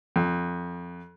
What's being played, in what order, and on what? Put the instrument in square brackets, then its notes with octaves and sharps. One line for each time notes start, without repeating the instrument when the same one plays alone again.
[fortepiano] F2